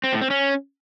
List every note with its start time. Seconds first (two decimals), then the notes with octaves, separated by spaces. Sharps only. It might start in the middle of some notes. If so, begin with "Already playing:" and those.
0.04 C4
0.13 A2
0.21 C4
0.30 C#4